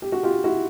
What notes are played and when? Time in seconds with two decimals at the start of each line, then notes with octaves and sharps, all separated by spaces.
0.02 G4
0.12 F#4
0.23 F4 G4
0.44 E4 F#4